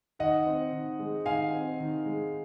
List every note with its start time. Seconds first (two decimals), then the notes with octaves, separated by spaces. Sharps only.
0.19 D#3 D#5 F#5
0.46 C4
0.73 D#3
0.99 G#3
1.26 D#3 F5 G#5
1.53 C4
1.80 D#3
2.06 G#3